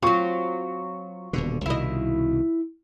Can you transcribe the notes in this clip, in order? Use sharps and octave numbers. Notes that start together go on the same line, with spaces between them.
F#3 C4 F4 C#6
D#1 B2 D3
C2 B2 D#3 E4 D#5